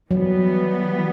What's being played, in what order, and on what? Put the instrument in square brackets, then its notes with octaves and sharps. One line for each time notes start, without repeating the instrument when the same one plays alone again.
[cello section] E3 G3 B3 [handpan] F#3